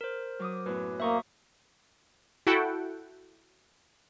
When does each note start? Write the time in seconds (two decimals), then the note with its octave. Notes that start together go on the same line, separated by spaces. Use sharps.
0.01 A#4 C5
0.39 F#3 D6 D#6
0.66 F#2 A2 B3 B4
1.00 A#3 C5 E5 A#5 C6 C#6 D#6
2.47 E4 F#4 A4 F#5 G5